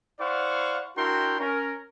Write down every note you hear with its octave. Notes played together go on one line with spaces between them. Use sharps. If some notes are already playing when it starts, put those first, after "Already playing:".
E4 C5 D5 F5 F#5 C#6
D4 E4 F#4 A#4 G5 C6
C#4 A#4